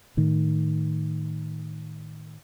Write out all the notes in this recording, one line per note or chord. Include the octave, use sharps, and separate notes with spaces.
A2 D#3